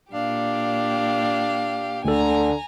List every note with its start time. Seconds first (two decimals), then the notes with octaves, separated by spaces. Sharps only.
0.12 A#2 D4 G4 F5
2.05 D2 D3 A4 G#5 A#5